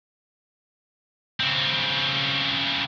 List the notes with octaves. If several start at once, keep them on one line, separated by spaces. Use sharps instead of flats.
C#3 C4